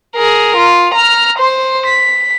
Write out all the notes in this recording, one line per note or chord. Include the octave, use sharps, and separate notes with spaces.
G#4 A#4
F4
A#5 F6
C5 C6
B6